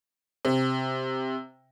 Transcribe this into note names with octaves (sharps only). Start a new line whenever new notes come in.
C3